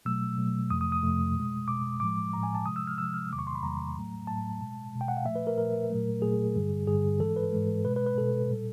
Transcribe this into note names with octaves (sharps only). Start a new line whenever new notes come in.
B2 F#3 A3 E6
B2 F#3 A3
F2 C3 F3 A3 D#6
D#6
D#6
F2 C3 F3 A3
B2 G#3
B2 G#3 D6
A2 F3 G#3 D6
A2 F3 G#3 A#5
G#5
A5
C3 F3 G#3 D#6
E6
F6
C3 F3 G#3 E6
F6
E2 C3 D#3 F#3 A3 D6
C#6
C6
B5
E2 C3 D#3 F#3 A3 A#5
A2 F#3 A3
A2 F#3 A3 A5
B2 G#3
B2 G#3
G5
F#5
F5
A#2 F3 A3 E5
B4
A#4
A#2 F3 A3 A#4
A#2 F#3 A3
A#2 F#3 A3 G#4
G2 D3 G3
G2 D3 G3 G#4
G#2 E3 G#3 A4
B4
G#2 E3 G#3
B2 G#3 B4
B4
B4
B2 G#3 A4
A#2 G3